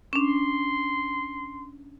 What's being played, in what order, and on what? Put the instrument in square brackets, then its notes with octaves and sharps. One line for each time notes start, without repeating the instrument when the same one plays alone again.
[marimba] C#4 D4 [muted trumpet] C6